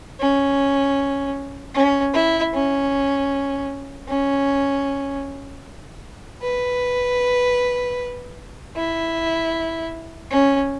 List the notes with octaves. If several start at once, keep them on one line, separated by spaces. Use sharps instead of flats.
C#4
C#4
E4
C#4
C#4
B4
E4
C#4